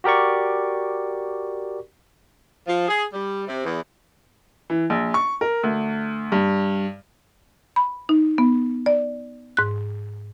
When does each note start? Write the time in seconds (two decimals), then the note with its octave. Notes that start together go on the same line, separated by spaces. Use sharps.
0.04 F#4 G4 A#4 D5 C#6
2.67 F3
2.89 G#4
3.13 G3
3.48 C3
3.65 E2
4.70 E3
4.90 A#1
5.14 C#6
5.41 A#4
5.63 D2
6.32 G2
7.76 B5
8.09 D#4
8.38 B3
8.86 D5
9.57 G#2 F#6